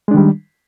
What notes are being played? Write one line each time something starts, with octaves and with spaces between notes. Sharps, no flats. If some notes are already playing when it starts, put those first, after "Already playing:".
D#3 G3 G#3 D4